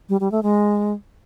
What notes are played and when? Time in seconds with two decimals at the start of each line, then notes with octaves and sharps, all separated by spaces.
0.09 G3
0.20 G3
0.32 A3
0.43 G#3